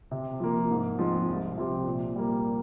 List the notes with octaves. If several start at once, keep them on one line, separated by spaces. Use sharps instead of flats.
C3
F3 A#3
G#2
F3 G#3 C4
C2
C3 F3 C4 G4
A#2
G3 A#3